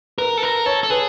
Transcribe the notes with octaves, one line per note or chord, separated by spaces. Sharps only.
A#4 B4
A4
A#4 B4
A4 C#5
A4
G#4 B4